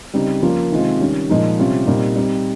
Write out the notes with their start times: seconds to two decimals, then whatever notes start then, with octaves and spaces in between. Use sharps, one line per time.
0.14 C#3 G3 C4 D#4
0.42 F3 A#3 C#4 F4
0.71 C3 D#3 G#3 C4 F4
1.00 D#3 G3 C#4
1.30 A#2 F3 G#3 D#4
1.59 C3 G3 C#4 F4
1.87 A#2 G3 C4 D#4
2.16 G3 C4 D#4